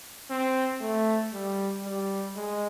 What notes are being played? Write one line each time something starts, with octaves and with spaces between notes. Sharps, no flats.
C4
A3
G3
G3
G#3